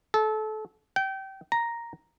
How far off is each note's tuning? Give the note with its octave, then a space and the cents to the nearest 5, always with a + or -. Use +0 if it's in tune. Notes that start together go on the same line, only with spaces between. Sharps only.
A4 -25
G5 -25
A#5 +0